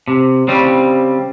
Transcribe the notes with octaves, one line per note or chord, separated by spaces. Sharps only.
C3
C#3 G3 C4